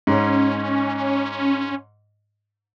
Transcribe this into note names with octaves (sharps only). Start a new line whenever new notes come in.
G#2 C#4